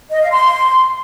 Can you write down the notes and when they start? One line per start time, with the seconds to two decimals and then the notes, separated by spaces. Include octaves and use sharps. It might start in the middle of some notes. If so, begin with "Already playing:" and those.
0.09 D#5
0.20 F5
0.31 C6